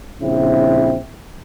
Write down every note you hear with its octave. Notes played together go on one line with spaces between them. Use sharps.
A#1 C#3 C4 E4